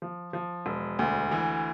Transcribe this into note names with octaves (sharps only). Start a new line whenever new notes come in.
F3
F3
E1
D2
E3